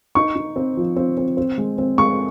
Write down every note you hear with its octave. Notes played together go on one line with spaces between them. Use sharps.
D#4 C#6
D#4
C4
F3
C4
C4
C4
G#3
C4
G#3 C#6